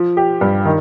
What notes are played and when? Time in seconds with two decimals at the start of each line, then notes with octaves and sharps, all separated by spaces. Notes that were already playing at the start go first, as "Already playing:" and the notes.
Already playing: F3
0.17 G4
0.41 G2
0.65 D#3